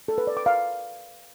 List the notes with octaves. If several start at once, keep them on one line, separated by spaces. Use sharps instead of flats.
A4
B4
D5
D6
F5